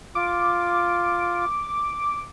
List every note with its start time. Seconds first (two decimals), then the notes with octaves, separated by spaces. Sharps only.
0.15 F4 D6